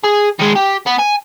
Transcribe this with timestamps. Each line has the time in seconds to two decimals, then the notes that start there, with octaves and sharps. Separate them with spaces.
0.04 G#4
0.40 D#3 G#3
0.56 G4
0.87 B3
0.99 G#5